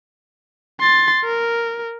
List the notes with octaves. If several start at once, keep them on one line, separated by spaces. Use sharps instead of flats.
C6 A6
A#4